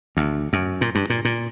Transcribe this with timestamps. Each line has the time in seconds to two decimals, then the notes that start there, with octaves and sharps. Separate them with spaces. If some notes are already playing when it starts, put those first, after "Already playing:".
0.17 D2
0.53 F#2
0.81 A#2
0.95 G2
1.10 A#2
1.25 A#2